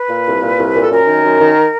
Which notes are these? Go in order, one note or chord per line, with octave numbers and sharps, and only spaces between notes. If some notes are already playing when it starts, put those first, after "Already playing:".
Already playing: B4
A#2
C2
A#2
C2
A#2
A4
F#2 A#4
D#3
F#2
D#3